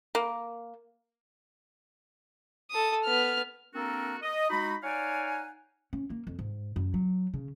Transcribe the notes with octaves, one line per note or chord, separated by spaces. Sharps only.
A#3
A4 D#6
B3 F6
A#3 C4 D4 F#4 A4 A#4
D#5
G#3 D#4 F#4 B5
D#4 C#5 D5 F5 F#5 G#5
C#4
A#3
F2
G#2
F#2
F#3
C#3